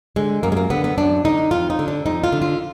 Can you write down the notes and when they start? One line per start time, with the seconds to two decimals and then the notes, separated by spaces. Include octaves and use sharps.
0.16 D3 G#3
0.43 F#2 A#3
0.52 G#3
0.57 A#3
0.70 D3 B3
0.84 B3
0.98 F#2 D4
1.25 D3 D#4
1.51 F2 F4
1.70 D#4
1.79 D3
1.88 D4
2.06 F2 D#4
2.24 F4
2.32 D3
2.42 F4